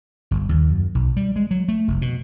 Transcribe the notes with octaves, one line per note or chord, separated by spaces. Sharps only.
G1
D#2
F#2
B1
G3
G#3
F#3
A3
F1
B2